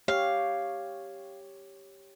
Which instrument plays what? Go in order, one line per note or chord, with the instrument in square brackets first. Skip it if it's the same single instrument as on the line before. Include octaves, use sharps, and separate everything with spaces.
[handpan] G4 C#5 [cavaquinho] F5